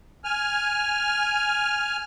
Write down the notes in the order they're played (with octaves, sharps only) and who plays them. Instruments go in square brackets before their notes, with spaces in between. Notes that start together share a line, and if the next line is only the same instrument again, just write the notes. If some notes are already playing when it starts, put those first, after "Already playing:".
[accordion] G#5 F6